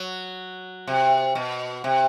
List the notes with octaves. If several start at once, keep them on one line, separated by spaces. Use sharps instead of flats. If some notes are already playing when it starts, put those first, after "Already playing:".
Already playing: F#3
C3
B2
C3